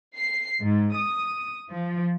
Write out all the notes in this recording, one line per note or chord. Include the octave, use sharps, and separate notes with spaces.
C7
G#2
D#6
F3